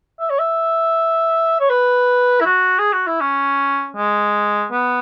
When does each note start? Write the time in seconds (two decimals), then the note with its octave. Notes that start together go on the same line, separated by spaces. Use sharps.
0.20 E5
0.30 C#5
0.39 E5
1.60 C#5
1.70 B4
2.40 E4
2.46 F#4
2.79 G#4
2.93 F#4
3.07 E4
3.21 C#4
3.97 G#3
4.72 B3